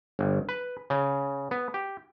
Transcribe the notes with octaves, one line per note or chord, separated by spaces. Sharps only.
G1
B4
C#3
B3
G4